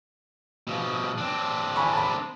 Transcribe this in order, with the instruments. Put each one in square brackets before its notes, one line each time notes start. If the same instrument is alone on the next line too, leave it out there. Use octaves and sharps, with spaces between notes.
[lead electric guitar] B2 F3
C4 D4
[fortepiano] G#5 B5 C#6
A5 B5